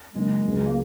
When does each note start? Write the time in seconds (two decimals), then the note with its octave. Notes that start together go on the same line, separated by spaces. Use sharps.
0.14 F#2 C#3 G#3 A#3 D#4
0.43 C#2 C#3 F#3
0.66 A#3